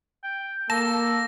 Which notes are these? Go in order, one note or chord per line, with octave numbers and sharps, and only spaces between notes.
G5
A#3 A4 A5 A#6